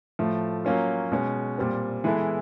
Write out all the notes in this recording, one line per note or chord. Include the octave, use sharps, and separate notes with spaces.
A2 F3 A3
F#3 A#3 C#4 F4
B2 G#3 C#4
A#2 G3 C4
E3 G#3 B3 E4 A4